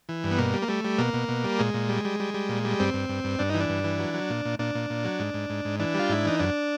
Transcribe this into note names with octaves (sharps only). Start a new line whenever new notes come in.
E3
G2
B3
B2 A#3
G3
A#3
G3 A3
G3
B2 A#3
B2
B2
G3
A#2 G#3
A#2
G3
G3
G3
G3
A#2
G3
G2 C4
G2
G2
G2
G2 D4
E3 D#4
D4
G2
E3
F#3
F#3
A#2
A#2
A#2 D4
A#2
A#2
F#3
G#2
G#2
G#2
G#2
E3 D4
G3 F4
G#2 E4
E3 D#4
F#2 D4